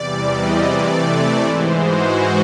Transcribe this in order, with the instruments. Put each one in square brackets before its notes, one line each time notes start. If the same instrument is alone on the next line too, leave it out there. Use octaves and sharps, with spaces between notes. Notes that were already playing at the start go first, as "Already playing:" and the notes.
Already playing: [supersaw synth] E2 C3 E3 G3 D5
D#5
C3 E3 A3 D5
G#2 E3 G#3 C5
F#4